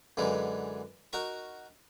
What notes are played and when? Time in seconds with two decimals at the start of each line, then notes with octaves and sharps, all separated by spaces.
0.17 F#2 D3 E3 G#3 D#4
1.13 D#4 F#4 A#4 A#5 C#6